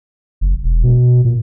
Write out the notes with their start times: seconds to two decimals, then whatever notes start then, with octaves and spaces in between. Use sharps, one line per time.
0.41 F#1
0.63 E1
0.83 B2
1.25 A#2